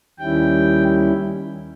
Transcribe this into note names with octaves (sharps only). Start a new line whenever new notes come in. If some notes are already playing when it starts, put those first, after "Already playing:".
D#2 D#3 G3 C#4 E4 G5